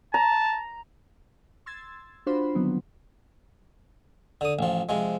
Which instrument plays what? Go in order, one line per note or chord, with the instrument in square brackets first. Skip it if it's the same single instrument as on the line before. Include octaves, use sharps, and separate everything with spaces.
[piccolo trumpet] A5 [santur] A#5
[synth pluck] C6 E6 G#6 A6
D4 F4 F#4 C5 B5 C6
D3 D#3 F#3 G3 B3 C4
[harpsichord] D3 D#6
A1 F3
C3 F3 G#3